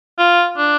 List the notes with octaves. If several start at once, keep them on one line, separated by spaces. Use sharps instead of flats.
F4
D4